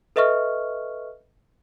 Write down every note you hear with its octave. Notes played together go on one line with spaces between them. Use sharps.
A4 B4 D#5 E5 C#6 F6